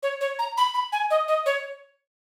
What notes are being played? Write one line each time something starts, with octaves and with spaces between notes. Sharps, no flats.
C#5
C#5
A#5
B5
B5
G#5
D#5
D#5
C#5